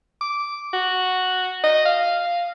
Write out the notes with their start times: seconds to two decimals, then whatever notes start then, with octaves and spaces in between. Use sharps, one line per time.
0.21 D6
0.74 F#4
1.64 D#5
1.86 F5